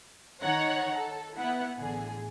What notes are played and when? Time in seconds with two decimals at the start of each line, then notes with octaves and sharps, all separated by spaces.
0.42 D#3 C#5 F#5 A#5
0.95 A4
1.37 B3 E4 F#5
1.78 A1 D3 G#4